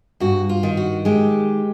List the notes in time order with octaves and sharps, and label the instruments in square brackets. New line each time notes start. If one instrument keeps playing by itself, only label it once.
[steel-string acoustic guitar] G2 F#4
F4
D#3
F#4
G#3 G4